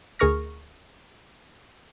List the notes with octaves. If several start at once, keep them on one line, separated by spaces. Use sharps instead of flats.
D2 G#4 A#4 C#6 F6 A#6